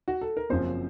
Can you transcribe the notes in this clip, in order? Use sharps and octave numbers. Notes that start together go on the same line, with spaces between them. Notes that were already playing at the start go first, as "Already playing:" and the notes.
F#4
A4
A#4
F#1 F#2 C#3 F3 C4 C5